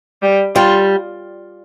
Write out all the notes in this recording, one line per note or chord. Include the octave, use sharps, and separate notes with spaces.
G3
G3 F4